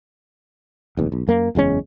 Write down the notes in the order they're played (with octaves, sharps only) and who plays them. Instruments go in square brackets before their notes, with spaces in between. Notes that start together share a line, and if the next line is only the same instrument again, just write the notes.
[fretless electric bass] F1 D#2
B1
F#2 A#3
F#1 E2 G#3 C#4